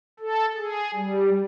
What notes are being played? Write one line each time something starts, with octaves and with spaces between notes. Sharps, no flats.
A4
G#4
G3